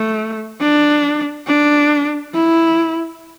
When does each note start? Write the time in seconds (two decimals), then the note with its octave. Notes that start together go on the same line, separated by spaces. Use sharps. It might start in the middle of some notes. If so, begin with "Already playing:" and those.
Already playing: A3
0.60 D4
1.47 D4
2.34 E4